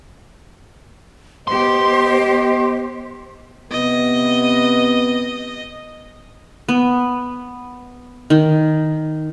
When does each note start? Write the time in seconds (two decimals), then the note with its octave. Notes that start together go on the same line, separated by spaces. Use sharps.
1.48 B3 G4 C5 D#5 C6
3.72 C3 B3 D#5
6.68 B3
8.30 D#3